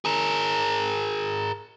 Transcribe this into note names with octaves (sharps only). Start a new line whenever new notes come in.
G#4 A#4